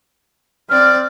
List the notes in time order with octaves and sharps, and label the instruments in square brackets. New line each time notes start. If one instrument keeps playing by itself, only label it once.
[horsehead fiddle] C4 D5 [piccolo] F6